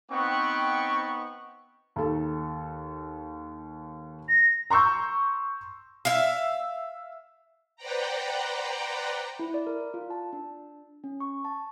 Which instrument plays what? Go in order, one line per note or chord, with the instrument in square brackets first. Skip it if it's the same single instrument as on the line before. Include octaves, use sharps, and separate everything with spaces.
[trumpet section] B3 C4 D#4 F#5 G5 C#6
[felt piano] D#2 A4
[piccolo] A#6
[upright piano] A#5 C6 C#6 E6 G6
[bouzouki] E5 F5
[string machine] B4 C5 D5 F#5 G5 A#5
[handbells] E4
D5
A#4
F4
A5
D4
C#4
C#6
A5